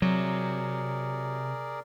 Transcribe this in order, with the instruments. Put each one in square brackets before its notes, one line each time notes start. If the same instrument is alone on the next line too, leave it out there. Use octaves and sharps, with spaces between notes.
[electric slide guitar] C3 [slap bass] F#3 [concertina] G#4 A#4 D5